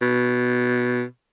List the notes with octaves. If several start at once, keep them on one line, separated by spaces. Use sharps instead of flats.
B2